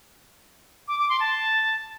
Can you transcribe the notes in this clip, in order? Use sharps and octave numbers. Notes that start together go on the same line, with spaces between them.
D6
D6
C6
A5